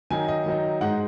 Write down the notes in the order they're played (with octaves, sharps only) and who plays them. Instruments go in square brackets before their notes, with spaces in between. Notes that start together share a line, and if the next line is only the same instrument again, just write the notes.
[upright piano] D#3 F#3 D#4 G#5
D#5
D#3 F#3 D#4
G#2 G#3 D#4 F#5